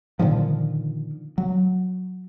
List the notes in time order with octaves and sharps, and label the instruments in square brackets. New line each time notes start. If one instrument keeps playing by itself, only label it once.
[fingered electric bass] A#2 D3 D#3 F3
F#3